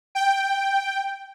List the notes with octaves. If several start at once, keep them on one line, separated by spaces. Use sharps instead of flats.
G5